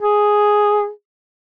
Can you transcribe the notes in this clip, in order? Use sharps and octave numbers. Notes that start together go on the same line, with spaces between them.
G#4